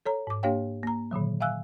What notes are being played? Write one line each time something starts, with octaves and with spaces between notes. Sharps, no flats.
A4 C#5 A#5
G#2 D6
A#3 D4 G4 C#5 F5 G5
A#3 A#5
A#2 D3 D#3 F#3
E5 F5 G#5 E6 F#6